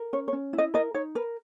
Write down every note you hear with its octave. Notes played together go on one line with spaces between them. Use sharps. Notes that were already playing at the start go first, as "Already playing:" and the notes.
Already playing: A#4
C#4 C#5
C#5
C#4
E4
D#5
A#4 D#5
D#4 C#5
A#4 B4